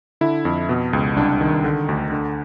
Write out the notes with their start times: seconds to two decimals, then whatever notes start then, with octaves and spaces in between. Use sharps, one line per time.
0.21 D3 E4
0.45 F2
0.69 B2
0.93 C#2
1.16 C2 D4
1.41 D#3
1.64 D3
1.89 D2
2.12 D3